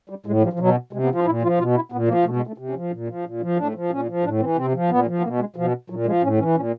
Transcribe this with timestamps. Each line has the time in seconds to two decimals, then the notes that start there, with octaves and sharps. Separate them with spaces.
0.09 G3
0.26 A2 G#3
0.43 F3 G3
0.53 F3
0.59 B2 F#3
0.93 C3 G#3
1.04 B3
1.09 F3
1.15 F4
1.26 A#2 E4
1.42 F3 F4
1.58 B2 F4
1.75 E4
1.92 A#2 B3
2.08 F3 A#3
2.25 B2 A3
2.36 G#3
2.47 A3
2.58 C3
2.70 C#4
2.75 F3
2.92 A#2
3.08 F3
3.25 A#2
3.41 F3
3.57 A2 D4
3.75 F3
3.91 A#2 C#4
4.08 F3
4.24 A2 D4
4.40 E3 C4
4.56 C3 C4
4.74 F3
4.90 A#2 B3
5.06 F3
5.20 B3
5.23 B2 A#3
5.40 G#3
5.56 B2 F3
5.90 A#2 F#3
6.06 F3 G#3
6.22 A2 C#4
6.39 E3 C#4
6.56 A#2 C#4